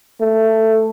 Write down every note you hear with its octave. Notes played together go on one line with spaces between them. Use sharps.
A3